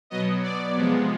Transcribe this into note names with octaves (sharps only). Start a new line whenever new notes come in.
B2 F#3 B3 D#5
D5
C3 F3 G#3 B3